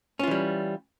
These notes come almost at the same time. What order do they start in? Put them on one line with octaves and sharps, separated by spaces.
C#4 F4 E3 G3